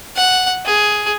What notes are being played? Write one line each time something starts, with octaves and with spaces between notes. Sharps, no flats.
F#5
G#4